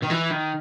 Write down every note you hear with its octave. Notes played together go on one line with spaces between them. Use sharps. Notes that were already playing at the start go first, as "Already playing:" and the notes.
D#3
E3
D#3